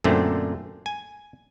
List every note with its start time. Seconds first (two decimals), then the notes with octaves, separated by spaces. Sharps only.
0.04 F#2 A#2 D3 A3 C4
0.86 G#5